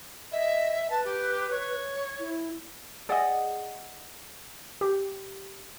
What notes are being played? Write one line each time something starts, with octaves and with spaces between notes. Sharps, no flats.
D#5 E5
B4 A5
G4
C#5
E4
G#4 D5 D#5 F#5
G4